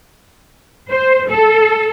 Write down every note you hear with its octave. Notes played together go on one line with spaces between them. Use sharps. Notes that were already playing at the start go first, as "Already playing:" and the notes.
C5
A4